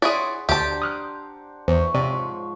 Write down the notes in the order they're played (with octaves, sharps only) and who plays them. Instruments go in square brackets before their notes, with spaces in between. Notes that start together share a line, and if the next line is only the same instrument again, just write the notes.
[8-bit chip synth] E4 [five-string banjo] G#4 C#5 D5 [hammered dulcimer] F#5 C6
[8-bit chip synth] D2 [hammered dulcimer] D4 C5 A#5 [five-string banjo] G4 A5
[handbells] D#6 F6 F#6
[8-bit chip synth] E2 [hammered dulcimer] E3 C#6 [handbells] C5
[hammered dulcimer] G#2 F3 C#5 [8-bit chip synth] C3 [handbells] D5